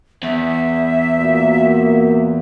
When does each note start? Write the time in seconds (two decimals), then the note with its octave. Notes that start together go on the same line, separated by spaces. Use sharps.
0.23 E2 E5
1.19 A#2 A#3 F#4